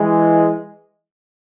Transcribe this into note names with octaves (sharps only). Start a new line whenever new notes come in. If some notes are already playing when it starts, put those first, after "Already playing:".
Already playing: E3 G#3